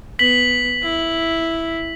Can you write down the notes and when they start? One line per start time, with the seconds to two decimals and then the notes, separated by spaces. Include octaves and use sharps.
0.19 B3 B6 F#7
0.83 E4